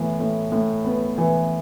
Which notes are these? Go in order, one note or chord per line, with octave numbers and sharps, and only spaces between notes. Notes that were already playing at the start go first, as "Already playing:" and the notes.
Already playing: A2 E3 B3
A2
A2
B3
E3